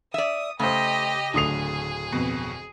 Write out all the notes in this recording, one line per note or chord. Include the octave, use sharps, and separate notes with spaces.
D5 E5 D#6
C#3 A3 G4 C5 D#5
D1 D3 A3 G#4 D#6 C7 F7
F2 B2